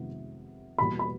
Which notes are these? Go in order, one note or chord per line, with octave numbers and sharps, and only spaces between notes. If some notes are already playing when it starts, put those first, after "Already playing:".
Already playing: F2 C3 D#3 G#3 B3
E2 B2 G3 A#3 B5
B5